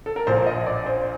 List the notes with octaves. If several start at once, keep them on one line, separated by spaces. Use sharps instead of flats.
A4
A#4
A#1 A#2 C5
D#5
D5
C5